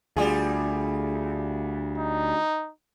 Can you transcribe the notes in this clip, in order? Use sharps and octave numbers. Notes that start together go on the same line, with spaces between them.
D2 G3 F4 G#4
D#4